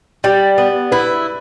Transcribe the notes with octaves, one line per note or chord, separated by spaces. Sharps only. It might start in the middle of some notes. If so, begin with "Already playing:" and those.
G3 D5
B3
E4 B4